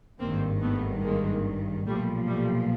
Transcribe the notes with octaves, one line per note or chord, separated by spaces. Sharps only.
G#1 G2 D#3 A#3 C4
A3 B3
G#3 A#3
B1 A#2 F3 G3 A3
G3 A3